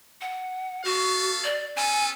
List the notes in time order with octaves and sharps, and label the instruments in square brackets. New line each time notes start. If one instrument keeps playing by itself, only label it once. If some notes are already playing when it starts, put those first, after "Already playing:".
[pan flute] F#5
[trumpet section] B3 A4 F5 [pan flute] F#4
[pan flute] D5
[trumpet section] B3 C#4 A4 [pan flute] G#5